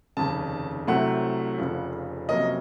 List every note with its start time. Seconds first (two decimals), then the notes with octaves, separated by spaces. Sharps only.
0.17 F1 D#2 C#3 A5
0.87 C2 C3 F#3 A3 F#5
1.58 F1 F2 C#3 F3
2.29 F2 C3 F#3 A#3 C#4 D#5